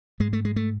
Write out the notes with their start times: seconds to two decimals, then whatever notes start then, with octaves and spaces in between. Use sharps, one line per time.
0.20 G#2 G#3
0.33 A3
0.45 G#3
0.56 A3